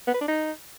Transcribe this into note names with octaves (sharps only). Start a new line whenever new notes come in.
B3
B4
D4
D#4